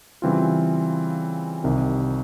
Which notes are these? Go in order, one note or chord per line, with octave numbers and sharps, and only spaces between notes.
C#3 E3 G3 C4 F4
C2 C3 D#3